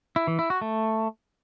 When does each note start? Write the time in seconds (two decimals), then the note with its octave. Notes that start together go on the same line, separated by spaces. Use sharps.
0.16 E4
0.27 E3
0.39 E4
0.50 F#4
0.61 A3